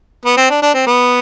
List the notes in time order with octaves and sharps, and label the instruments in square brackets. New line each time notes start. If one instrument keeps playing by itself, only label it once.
[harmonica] B3
C4
D4
D4
C4
B3